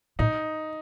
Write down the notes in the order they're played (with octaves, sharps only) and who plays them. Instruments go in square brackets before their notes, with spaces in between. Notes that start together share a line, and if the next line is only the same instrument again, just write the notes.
[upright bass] A2 [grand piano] D#4